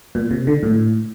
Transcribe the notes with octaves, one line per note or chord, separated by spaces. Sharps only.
A#2
C3
D3
A2